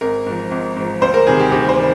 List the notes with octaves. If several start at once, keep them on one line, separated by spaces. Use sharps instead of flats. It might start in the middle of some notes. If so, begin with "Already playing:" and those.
G#1 A#4
G#2 F3
G#1
G#2 F3
D2 C5
A#4
C3 D#3 G3 G#4
G4
D2 G4
C5
D#3 G3